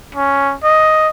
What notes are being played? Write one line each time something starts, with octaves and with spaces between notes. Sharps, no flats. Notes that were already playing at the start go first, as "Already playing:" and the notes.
C#4
D#5